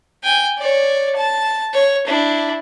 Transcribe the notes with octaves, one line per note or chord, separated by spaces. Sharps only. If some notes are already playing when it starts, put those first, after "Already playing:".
G5 G#5
C#5 D5
A5
C#5
D4 E4